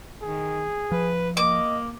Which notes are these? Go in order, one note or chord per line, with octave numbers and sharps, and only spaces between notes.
D#3 G#4
F3 B4
A#3 D#5 D6